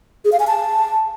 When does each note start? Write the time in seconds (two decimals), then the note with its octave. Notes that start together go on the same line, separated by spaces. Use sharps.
0.25 G#4
0.32 F5
0.40 G#5
0.47 A5